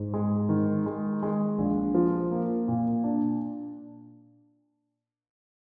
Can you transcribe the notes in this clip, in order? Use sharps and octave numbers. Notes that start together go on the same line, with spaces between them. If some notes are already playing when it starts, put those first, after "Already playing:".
Already playing: G#2
G#3
D#3
G#3
G#3
A#1
F3
A#3
A#2
D4